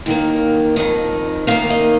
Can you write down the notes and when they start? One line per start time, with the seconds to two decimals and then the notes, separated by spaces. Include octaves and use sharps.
0.06 D#2 D#3 A#3
0.76 F2 C3 D#3 D#5
1.47 D#2 D#3 A#3 F5
1.70 D#5